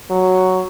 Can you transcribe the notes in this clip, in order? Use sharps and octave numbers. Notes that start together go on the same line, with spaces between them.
F#3